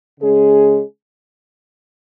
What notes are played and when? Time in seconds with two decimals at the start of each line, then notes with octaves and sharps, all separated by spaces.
0.20 C#3 G#3 C#4 G#4